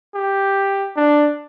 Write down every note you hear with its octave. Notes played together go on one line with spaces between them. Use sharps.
G4
D4